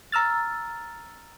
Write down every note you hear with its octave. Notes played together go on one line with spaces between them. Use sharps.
A#5 E6 F6 A6